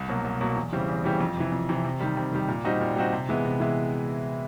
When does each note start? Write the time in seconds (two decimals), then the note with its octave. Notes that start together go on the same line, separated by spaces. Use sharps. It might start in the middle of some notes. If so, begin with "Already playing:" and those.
Already playing: C2
0.08 B2 F#3 A#3
0.24 C2
0.41 B2 F#3 A#3
0.57 E2
0.73 C#3 E3 G3 C4
0.88 E2
1.04 C#3 E3 G3 C4
1.21 F2
1.37 C3 E3
1.52 F2
1.69 C3 E3
1.84 C3
2.00 D#3 G3
2.17 C3
2.33 D#3 G3
2.48 A#2
2.65 G3 C4 D#4 F#4
2.81 A#2
2.96 G3 C4 D#4 F#4
3.12 C3
3.29 E3 G#3 B3 E4
3.45 C3
3.60 E3 G#3 B3 E4